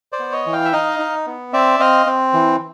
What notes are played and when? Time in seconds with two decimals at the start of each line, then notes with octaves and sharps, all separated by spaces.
0.12 C5 D5
0.20 B3
0.32 C#5 D#5
0.46 E3
0.53 F5 G5
0.65 E5
0.73 D#4 D#5 F5
0.99 D#4
1.27 B3
1.53 C4 D5 E5
1.79 C4 D#5 F5
2.06 C4
2.33 E3